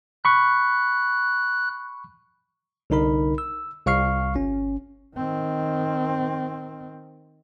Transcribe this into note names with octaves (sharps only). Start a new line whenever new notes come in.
B5 C#6 F#6
C2 D3 D#4 A#4 B5
E6
C2 F5 C#6 F6 C7
G1 C#4
D#3 C4